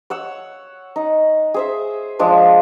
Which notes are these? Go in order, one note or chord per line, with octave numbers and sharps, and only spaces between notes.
C#5 F#5 E6
D#4
G#4 C5 E5
F3 G#3 D4 C5